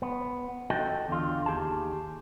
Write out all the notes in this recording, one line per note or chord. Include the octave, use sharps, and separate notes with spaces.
B3
F#4 A4 D#5 G5
E2 D3 F4
D#2 G4 G#4 A5